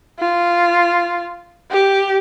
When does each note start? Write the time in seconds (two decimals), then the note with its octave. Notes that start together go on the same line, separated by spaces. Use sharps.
0.19 F4
1.71 G4